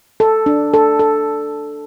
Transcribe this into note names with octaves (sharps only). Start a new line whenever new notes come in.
A4
D4
A4
A4